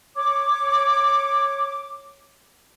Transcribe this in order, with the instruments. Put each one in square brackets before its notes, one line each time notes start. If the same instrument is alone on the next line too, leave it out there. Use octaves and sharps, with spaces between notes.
[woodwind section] C#5 D6